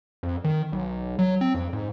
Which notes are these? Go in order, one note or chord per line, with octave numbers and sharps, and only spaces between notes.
F2
D#3
B1
F#3
C4
F2
G#2